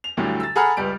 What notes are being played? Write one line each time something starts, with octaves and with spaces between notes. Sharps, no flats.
F7
D2 A2 D3 F#3 G3 A3
E6 A6
G#4 A4 F#5 A#5 B5 F6
C#2 G3 B4 D7